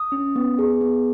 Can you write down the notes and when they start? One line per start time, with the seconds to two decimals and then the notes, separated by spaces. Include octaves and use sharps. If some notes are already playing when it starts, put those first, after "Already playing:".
Already playing: D#6
0.12 C#4
0.36 B3
0.59 G#4
0.81 B3